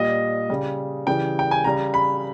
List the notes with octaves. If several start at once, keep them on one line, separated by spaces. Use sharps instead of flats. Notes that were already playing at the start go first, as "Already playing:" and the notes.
Already playing: A#2 G3 D#5
C#3 G3
C#3 E3 G3 G5
G5
G#5
C#3 G3 A#5
B5